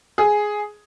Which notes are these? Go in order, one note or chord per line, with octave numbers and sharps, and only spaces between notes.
G#4